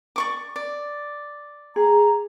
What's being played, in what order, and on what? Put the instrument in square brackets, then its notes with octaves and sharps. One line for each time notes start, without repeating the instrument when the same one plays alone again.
[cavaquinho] D5 C#6 D6
D5
[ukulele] G#4 [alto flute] A#5